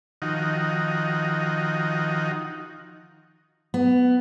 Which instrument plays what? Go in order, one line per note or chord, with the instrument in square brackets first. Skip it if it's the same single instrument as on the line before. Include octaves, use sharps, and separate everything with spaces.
[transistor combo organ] D#3 F3 D#4 F#4
[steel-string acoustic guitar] B3